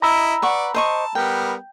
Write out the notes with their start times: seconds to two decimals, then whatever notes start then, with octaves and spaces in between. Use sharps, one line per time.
0.02 E4 D#5 A#5 B5 E6
0.42 B4 D5 F#5 C#6
0.74 C5 D#5 A5 C#6
1.15 G3 B3 A#4 G5